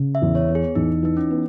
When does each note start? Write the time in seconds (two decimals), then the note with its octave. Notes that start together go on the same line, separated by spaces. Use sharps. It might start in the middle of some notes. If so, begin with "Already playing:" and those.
Already playing: C#3
0.15 E5
0.22 E2
0.35 C#5
0.48 B3
0.55 G#4
0.75 E2 D#4
1.03 E3 D#4
1.17 C#4
1.30 B3